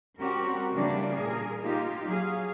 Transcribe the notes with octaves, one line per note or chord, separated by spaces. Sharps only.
G3 C4 C#4 F#4 G4 A#4
C#3 E3 G3 A#3 D4 D5
A#2 G#4 A#4
A#3 D#4 F4 G4
F#3 G#4 F5